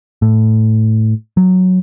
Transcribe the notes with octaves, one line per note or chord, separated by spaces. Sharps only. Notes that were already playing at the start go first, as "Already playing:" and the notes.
A2
F#3